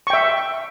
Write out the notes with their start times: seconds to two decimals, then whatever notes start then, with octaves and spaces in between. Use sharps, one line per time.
0.07 C#6
0.10 G5
0.13 E5